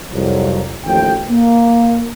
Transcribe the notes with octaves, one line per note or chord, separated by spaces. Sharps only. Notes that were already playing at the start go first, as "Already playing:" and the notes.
C2 F2 F#3
A1 D#2 A2 F3 G5
A#3